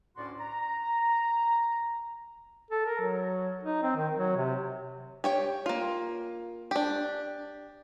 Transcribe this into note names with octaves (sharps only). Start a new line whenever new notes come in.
D2 A2 C#4 F#4 D5 C6
A#5
A4
A#4
F#3
D#4
C4
D#3
F#3
C3
G4 C#5 G5
A#3 F4
D4 G4